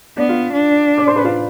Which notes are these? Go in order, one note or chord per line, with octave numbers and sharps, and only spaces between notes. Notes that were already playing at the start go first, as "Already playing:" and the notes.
B3 D4 D5
F4 F5
D4
D5 D6
C5 C6
B4 B5
F4 F5